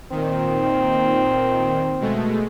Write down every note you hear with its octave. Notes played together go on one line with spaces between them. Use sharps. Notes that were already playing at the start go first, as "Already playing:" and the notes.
A#2 D#3 C4
B2 G#3 A3